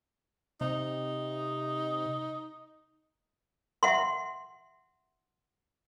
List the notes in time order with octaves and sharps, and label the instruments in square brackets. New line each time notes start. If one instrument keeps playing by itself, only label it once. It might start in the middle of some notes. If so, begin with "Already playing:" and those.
[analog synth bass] C3 [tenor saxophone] D#4
[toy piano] E5 F#5 C6